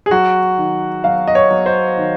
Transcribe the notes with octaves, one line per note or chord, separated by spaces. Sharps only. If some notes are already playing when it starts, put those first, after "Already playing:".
G#4
F#3 F#4
D#3
F#3 F5
D#5
C#5
F#3
C5
D#3